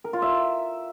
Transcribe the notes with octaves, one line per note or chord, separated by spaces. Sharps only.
A#4
F4
E5